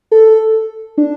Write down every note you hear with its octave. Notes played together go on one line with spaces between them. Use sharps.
A4
D4